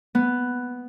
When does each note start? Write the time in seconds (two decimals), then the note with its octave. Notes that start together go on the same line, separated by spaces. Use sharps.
0.15 B3